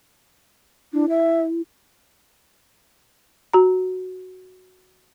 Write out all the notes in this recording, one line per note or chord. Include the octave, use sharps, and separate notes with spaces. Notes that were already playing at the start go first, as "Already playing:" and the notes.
D4 E4
E5
F#4 A#5